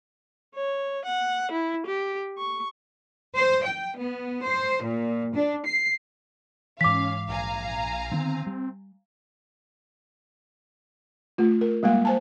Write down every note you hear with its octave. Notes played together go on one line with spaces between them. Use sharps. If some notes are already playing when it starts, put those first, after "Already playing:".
C#5
F#5
E4
G4
C#6
C5
G5
B3
C5
A#2
D4
C7
G#2 E3 C#4 F5 D6 B6
A#1 F5 G#5 A#5
D3 D#3 B3 C4
G3
A3 F4
A#4
G3 G#3 A#3 F5
C5 G#5 A5